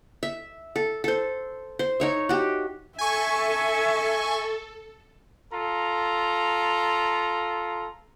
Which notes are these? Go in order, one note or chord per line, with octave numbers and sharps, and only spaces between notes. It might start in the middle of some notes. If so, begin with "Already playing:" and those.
E5
A4
A4 C5
C5
D#4 C#5 E5
F#4 G4
A4 E5 G#5 C#6
F4 A4 A#5